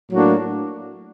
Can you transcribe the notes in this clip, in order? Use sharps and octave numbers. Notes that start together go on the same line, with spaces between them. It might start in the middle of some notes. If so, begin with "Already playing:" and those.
A2 F#3 A#3 D4 F#4